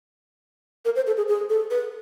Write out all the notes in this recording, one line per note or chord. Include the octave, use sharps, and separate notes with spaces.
A#4
C5
A4
G#4
G#4
A4
B4